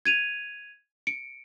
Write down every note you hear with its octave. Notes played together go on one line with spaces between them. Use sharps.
G#6 D#7 F7
C#7 D7